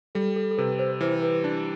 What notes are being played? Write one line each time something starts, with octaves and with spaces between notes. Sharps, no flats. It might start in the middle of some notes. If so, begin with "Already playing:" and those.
G3 A4
A4
A4
C3 B4
C5
E3 C5
B4
D4